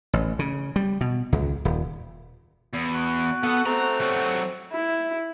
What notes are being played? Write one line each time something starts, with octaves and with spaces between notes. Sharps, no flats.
A1
C#3
G3
B2
C#2
D#1
E2
F#4
B3 A4 F#5
A3 C4 A#5
F#3 G3
E4